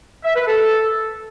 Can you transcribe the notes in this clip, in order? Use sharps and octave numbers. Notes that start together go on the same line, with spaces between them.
E5
B4
A4